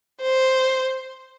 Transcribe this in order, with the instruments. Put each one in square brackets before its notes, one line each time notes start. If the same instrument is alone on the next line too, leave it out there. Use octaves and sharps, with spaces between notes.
[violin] C5